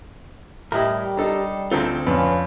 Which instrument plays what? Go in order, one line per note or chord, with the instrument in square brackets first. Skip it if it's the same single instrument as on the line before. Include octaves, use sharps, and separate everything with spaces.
[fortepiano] A2 E4 D#5 [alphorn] G3 [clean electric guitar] G4 A#4
[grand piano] D4 [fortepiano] D#4 A4 A#5
[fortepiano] D2 C4 A4 [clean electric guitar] F4 C5 A#5
[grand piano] F2 [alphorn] C#4 [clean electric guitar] B4 D5 F5